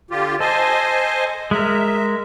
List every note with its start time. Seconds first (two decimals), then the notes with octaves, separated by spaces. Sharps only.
0.11 D3 F4 G4
0.40 A4 C5 D#5 G#5
1.51 G#3 A#4 E5